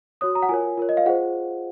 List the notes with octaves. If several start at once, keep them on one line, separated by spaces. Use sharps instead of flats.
F#4 C#5 D#6
A#5
F#5
F4 A#4 C#5 G#5
F4 A#4 C#5
D#5
F5
F4 G#4 C5 F#5